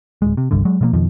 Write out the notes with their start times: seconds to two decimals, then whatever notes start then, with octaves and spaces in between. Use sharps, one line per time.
0.22 D1 G#3
0.37 C3
0.51 G1 C2 G2 D3
0.65 F#3 G#3
0.81 B2 F3 G3 A#3
0.93 F2 B2 D#3 F3